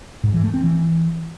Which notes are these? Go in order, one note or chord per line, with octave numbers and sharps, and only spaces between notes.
G#2
E3
A3
C4
E3